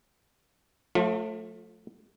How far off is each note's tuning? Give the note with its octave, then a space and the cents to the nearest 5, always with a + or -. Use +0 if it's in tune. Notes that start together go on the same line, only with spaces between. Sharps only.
F3 +45 A3 +0 F4 +15